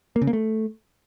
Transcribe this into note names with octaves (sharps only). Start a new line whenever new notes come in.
A#3
C#3
A#3
A3